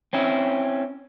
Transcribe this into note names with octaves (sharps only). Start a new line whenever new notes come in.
C4 C#4 E4